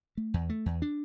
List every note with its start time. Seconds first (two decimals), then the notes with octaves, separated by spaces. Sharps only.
0.17 A3
0.34 E2
0.50 A3
0.66 E2
0.82 D4